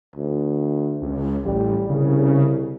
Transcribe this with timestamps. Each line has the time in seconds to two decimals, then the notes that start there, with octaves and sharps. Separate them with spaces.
0.16 D2
1.02 C#2
1.45 A1 G3
1.90 C2 C#3